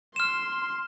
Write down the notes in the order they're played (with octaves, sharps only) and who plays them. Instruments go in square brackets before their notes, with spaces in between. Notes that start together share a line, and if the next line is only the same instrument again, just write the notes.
[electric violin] C6 [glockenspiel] F6 E7